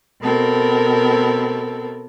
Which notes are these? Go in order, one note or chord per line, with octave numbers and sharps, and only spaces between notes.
B2 B3 C4 A4 A#4